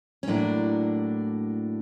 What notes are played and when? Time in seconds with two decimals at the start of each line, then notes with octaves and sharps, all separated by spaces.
0.23 C#4
0.27 A2 F#3 A#3 D4